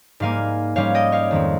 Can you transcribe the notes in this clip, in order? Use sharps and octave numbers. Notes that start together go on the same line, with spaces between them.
G#2 G3 A#3 F5 G#5
G#2 G3 C#4 C#5 F5
D#5 G5
C#5 F5
F2 D#3 G#3 C4